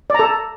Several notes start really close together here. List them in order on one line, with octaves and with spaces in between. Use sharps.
D5 A#5 A4